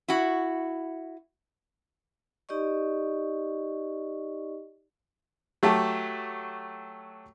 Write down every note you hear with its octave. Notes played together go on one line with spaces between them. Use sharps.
E4 F#4
D#4 G4 D5 D#5 C#6
F#3 A3 G4 A5